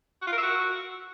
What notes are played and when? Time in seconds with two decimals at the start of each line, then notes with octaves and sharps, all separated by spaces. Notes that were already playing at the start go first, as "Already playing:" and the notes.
0.22 F#4
0.27 F4
0.32 A#4
0.38 E5
0.43 F#4